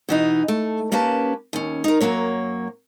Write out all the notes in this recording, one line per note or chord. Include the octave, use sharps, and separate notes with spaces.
B2 E3 D#4
A3
A#3 C#4 G4 B4 A5
D#2 C#4
D#4 A#4
F#2 C3 F#3 A#3 C#5